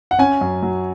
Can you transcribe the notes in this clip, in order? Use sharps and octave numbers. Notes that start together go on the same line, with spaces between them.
F#5
C#4 G#5
F#2
F#3